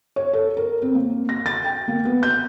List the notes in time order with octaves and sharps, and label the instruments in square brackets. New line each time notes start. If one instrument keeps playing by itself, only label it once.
[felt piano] C#5
A4
A#4
C4
A#3
A#6
A6
G5
A#3
B3
G6